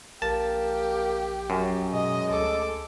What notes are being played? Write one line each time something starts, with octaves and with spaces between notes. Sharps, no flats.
A#1 A#3 G4 A5
F#2
B2 G#3 D#5
D2 A4 D6